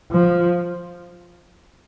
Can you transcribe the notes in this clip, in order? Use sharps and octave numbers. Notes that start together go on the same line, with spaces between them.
F3